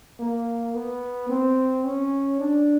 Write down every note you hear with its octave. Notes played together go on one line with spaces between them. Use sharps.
A#3
B3
C4
C#4
D4